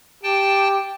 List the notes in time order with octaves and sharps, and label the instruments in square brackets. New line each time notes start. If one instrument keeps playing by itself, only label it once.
[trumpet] G4 [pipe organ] G5 A5